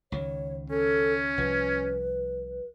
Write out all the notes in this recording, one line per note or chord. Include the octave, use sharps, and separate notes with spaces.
C#2 D#3 C#5
C#4 A4
C2 F3 B4